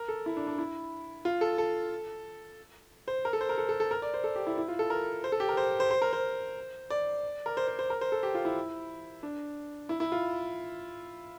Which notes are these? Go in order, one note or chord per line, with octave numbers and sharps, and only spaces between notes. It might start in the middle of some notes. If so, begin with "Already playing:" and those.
Already playing: A#4
A4
E4
D4
D4
E4
F4
A4
A4
C5
A#4
A4
C5
A#4
A4
A4
A4
A#4
D5
C5
A4
G4
E4
E4
F4
A4
A#4
C5
A4
G4
A#4
C5
C5
C5
A#4
C5
D5
A#4
C5
C5
C5
A#4
C5
A4
G4
F4
E4
D4
E4
E4
F4